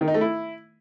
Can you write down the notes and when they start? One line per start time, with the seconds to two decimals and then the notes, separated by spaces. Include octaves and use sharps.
0.01 D#3
0.08 D#4
0.14 A3
0.21 E4